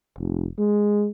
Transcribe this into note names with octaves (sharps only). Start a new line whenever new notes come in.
F1
G#3